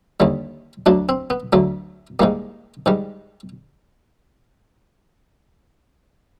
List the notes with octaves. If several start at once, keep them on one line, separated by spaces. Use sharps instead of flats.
D#2 D3 G3
D2 D3 F#3 D4
C4
B3
D2 D3 F#3 A3
G#2 D#3 G3 A#3
G#2 D#3 G3